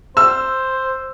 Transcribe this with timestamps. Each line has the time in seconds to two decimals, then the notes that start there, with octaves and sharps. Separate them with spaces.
0.17 C5 E6